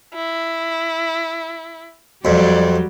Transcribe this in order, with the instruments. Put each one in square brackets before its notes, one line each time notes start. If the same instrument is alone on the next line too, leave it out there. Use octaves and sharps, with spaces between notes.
[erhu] E4
[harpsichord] F2 [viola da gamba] F#3 G3 [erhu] D5